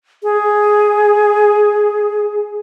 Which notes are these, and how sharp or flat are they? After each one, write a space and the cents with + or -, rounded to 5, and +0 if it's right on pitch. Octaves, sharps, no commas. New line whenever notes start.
G#4 +5